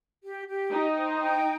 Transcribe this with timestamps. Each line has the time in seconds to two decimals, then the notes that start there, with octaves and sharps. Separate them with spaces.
0.22 G4
0.47 G4
0.71 D#4 G5
0.97 C5
1.21 G5